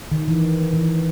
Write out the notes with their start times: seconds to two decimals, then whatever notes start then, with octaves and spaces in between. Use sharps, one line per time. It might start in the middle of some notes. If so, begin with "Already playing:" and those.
0.12 D#3
0.28 E3
0.73 E3